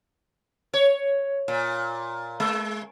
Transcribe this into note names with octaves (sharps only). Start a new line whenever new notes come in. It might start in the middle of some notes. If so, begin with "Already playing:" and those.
C#5
A#2
G#3